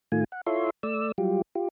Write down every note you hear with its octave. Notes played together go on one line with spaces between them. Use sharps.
A2 D#3 A3 F4 G#5
F#5
E4 F4 A4 C#5 E5 C6
A3 D5 E6
F#3 G3 F4 G4
F4 G4